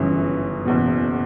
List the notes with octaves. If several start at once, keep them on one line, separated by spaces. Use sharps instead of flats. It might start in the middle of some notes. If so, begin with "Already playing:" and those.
Already playing: G1 F#2 C#3 E3
F#1 E2 B2